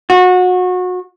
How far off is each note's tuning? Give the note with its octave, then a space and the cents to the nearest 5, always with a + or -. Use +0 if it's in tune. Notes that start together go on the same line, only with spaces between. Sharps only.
F#4 -25